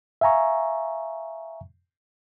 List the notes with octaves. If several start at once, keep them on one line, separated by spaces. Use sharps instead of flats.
E5 F5 G#5 A#5 C#6